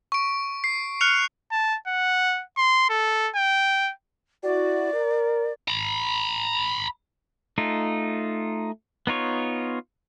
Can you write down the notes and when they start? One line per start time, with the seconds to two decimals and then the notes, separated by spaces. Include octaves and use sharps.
0.12 C#6 D7
0.64 C7
1.01 F6 F#6 C#7 F7
1.51 A5
1.87 F#5
2.57 C6
2.89 A4
3.35 G5
4.43 E4 F#4 D5
4.93 A#4
5.68 A#5 B5
7.58 A3 D#4 F4
9.07 B3 D#4 F4 C#5